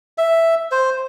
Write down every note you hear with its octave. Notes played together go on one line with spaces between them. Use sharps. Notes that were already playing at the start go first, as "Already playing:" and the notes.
E5
C5